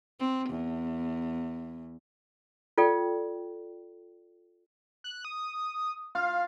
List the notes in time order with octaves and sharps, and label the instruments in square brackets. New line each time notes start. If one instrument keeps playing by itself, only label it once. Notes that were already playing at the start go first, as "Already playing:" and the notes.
[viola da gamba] C4
E2
[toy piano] F4 A4 D5 G5
[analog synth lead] F#6
D#6
[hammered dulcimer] F4 [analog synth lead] F5